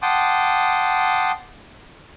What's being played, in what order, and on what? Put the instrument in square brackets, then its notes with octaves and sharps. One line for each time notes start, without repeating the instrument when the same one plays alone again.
[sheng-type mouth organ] F#5 G5 A5 C6 D6 D#6